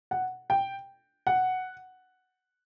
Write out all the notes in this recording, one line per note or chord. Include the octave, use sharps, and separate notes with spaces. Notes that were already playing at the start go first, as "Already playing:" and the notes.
F#5
G5
F#5